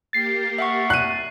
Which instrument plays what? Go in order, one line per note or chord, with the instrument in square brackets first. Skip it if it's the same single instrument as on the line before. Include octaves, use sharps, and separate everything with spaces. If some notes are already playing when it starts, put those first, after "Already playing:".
[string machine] A#3 G4 A#4 [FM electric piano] A6 C7
[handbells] E5 F#5 C#6
[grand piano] F#6 D#7